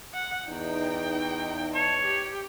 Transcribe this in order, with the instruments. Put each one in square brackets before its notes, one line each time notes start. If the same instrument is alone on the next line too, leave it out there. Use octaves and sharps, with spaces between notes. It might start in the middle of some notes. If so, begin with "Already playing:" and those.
[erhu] F#5
[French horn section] E2 D#4 [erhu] G5
[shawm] C#5 [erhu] A5
[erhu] G4